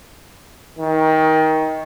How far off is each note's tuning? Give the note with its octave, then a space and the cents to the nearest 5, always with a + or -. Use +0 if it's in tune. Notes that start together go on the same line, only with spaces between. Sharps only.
D#3 +20